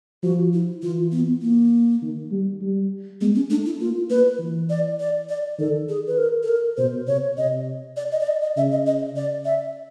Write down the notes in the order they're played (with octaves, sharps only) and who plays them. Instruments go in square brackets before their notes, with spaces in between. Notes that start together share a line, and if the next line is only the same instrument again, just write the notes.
[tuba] F3 [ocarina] F#4
[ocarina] E4
[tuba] E3 [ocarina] F4
[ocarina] B3
A#3
[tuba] D#3
G3
G3
[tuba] G#3 [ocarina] B3
[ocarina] C#4
[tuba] A3 [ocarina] D4
[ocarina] E4
[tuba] A#3 [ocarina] F4
[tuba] A#3 [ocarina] B4
[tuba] E3
[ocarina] D5
D5
D5
[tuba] D#3 [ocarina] A4
[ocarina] G#4
B4
A#4
A4
A#4
[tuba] B2 [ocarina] C5
[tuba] C3 [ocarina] C#5
[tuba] C3 [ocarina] D#5
[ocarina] D5
D#5
D5
D#5
D#5
[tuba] C#3 [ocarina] E5
[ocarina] D#5
D#5
D5
E5